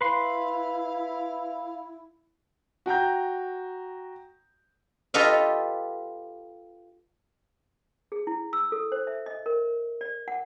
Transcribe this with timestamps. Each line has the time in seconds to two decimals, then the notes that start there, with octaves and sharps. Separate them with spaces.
0.01 E4 B4 F5 C6
2.86 F#4 G5 A#5 G6
5.14 F4 G4 A4 B4 D#5 F5
8.12 G#4
8.27 E4
8.53 E6
8.72 A4
8.92 C5
9.07 E5
9.26 D#5
9.46 A#4
10.01 D5
10.28 F#5